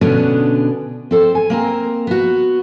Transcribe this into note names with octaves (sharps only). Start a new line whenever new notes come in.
B2 D3 B3 C#4 D4
C4 A4 C5
G#5
A#3 C4 A#4
B3 F#4